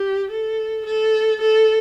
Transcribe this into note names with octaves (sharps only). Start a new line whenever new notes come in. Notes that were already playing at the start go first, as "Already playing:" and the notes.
Already playing: G4
A4
A4
A4